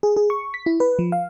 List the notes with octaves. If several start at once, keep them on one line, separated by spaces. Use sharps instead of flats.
G#4
G#4
C#6
B6
E4
B4
F3
F5